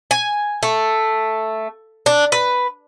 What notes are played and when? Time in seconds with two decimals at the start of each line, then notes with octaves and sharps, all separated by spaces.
0.11 G#5
0.63 A3
2.06 D4
2.32 B4